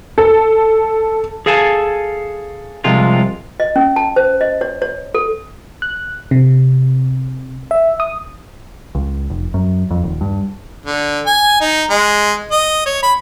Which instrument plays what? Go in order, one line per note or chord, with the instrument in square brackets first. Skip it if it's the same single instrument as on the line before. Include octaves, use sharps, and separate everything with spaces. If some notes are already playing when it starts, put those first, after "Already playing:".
[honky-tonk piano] A4
[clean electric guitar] G#4 A4 F5 G#5 A5
C2 C3 F3 G#3 F4
[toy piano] D#5
C#4
A5
C5
D#5
C#5
C#5
A4
[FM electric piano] F#6
C3
E5
D#6
[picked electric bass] C#2
F1
F#2
F2
D#1
G2
[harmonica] D3
G#5
D#4
G#3
D#5
C#5
B5